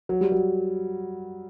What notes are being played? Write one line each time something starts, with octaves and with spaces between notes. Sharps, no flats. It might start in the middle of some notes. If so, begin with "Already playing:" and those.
F#3
G3
F#3